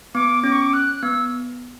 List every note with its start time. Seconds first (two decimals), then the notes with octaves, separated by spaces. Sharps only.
0.15 B3 D6
0.44 C#4 D6
0.52 C#6
0.61 D6
0.73 F#6
1.02 B3 E6